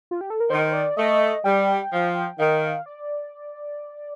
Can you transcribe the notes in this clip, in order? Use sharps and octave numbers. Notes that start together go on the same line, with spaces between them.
F4
G4
A4
A#4
D#3 C5
D5
A3 D#5
G3 G5
F3
D#3 F5
D5